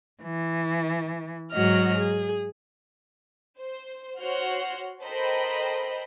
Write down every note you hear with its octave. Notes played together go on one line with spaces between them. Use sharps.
E3
G#2 F#3 F#4 D#5 F6
G#4
C5
F#4 C5 C#5 F#5 C6 F6
A4 A#4 C5 D#5 G5 B5